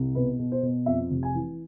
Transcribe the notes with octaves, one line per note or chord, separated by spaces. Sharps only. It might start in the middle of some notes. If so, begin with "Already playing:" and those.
Already playing: C2
B2 B4
B2
C5
B2
F2 E5
F1
G#5
E3